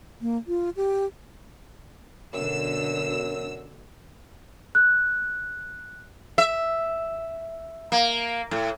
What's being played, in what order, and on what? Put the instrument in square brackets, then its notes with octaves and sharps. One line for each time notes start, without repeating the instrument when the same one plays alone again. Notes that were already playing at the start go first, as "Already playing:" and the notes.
[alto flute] A#3
F4
G4
[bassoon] F#2 [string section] B2 D3 E6
[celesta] F#6
[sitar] E5
A#3
A2